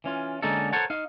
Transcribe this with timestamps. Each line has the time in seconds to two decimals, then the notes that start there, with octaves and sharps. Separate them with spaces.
0.04 E3 C#4 F4
0.42 D3 G#3 A#3 C#4 D#4 A4
0.73 A4 A#4 C5 C#5 F#5 A5
0.90 D#4 F5